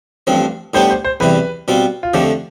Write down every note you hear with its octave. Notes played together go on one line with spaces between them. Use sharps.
A1 G2 F3 C4
A2 G3 B3 D4 G4 C5
C5
C5
E2 C3 E3 G3 B4
B2 G3 C4 F4
F4
F2 D3 F3 A3 G4